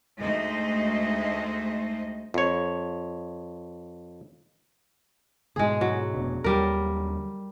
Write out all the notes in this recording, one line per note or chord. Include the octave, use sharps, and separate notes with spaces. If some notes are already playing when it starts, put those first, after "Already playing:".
D2 G#3 A3 D#4 C5 D#5
F2 C#5
G#2 B2 D3 G#3 G#4
F#3
F1 B2 D4
D#2 D3 F#3 G3 A#4